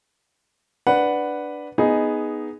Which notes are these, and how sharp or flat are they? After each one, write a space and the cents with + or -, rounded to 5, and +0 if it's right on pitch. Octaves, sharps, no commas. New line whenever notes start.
D4 +0 B4 +0 F#5 +0
B3 +0 D#4 +0 G#4 +0